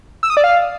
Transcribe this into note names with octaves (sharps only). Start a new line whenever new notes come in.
E6
D#6
D5
F5